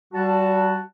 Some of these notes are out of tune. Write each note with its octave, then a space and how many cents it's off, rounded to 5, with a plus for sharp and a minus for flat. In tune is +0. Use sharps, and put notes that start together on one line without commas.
G3 -35 F#4 +0 A5 +0